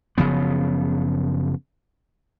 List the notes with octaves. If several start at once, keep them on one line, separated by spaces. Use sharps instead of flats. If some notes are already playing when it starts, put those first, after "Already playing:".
F#1 C#3 F3 B3